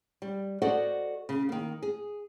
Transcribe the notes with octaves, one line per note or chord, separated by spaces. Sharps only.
G3
F#4 A4 C5 D5 D#5 F#5
C#3
D#3 A#3
G#4